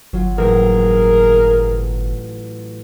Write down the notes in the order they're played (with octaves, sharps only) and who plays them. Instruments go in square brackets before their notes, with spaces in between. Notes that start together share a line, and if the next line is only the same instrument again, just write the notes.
[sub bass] G1 [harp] F#3 F4
[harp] A1 [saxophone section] A#3 G#4 A#4